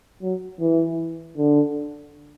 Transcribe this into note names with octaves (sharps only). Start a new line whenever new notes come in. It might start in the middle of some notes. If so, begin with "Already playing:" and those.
F#3
E3
D3